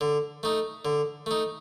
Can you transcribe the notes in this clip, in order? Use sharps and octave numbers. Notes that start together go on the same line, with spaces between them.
D3
A3 D#4
D3
A3 D#4